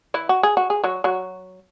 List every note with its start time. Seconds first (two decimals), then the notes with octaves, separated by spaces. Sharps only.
0.14 E3 E4
0.29 F#4
0.43 G#4
0.57 F#4
0.70 G#4
0.83 F#3 F#4
1.04 F#3 F#4